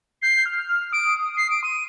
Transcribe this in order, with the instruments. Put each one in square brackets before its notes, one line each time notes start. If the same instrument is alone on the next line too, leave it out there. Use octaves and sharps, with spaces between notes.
[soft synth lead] G6 [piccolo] C7
[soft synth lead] F6
F6
[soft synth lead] D#6 [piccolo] D7
[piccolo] C7
D7
[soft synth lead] C6 [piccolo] D#7